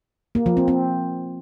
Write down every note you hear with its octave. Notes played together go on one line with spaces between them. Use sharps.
A#3
F3
C4
C4